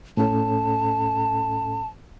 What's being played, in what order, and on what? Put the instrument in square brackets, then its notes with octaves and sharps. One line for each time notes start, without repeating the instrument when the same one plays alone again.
[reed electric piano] A2 C#4 A4 [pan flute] A5